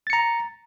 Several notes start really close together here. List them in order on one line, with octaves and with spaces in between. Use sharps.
A6 C#7 A#5